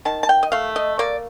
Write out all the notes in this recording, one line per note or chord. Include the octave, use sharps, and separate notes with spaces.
D#3 A5
A5
G5
D#5
A3 F5
D#5
A#3 D5